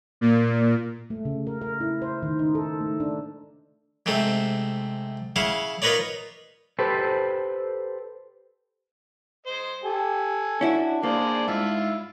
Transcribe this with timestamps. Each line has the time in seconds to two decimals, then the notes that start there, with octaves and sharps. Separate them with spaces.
0.21 A#2
1.10 A3
1.25 C#3
1.47 A#4
1.61 A#4
1.80 E4
2.02 C5
2.23 D#3
2.39 D#4
2.55 A4
2.81 A3
3.00 D4
4.06 G#2 C3 A3 C4
5.36 C#3 E4 F5 F#5 D6
5.82 D#4 F4 A#4 B4 C#5 D5
6.79 G4 A4 B4 C5
9.46 C5 D#5
9.84 G4 A4 G#5
10.61 C#4 D4 E4 F#4
11.03 A#3 G#4 C5 D5
11.48 G#2 E4 F4 E5